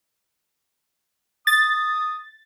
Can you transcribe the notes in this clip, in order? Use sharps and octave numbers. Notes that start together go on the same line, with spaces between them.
D#6 A6